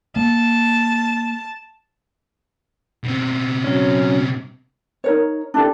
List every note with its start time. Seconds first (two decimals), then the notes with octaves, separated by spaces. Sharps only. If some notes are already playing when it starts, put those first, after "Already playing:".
0.16 A#3 A5
3.04 B2 C4
3.64 F#3 C#4
5.04 D#4 A#4 C#5
5.54 D4 E4 G4 A4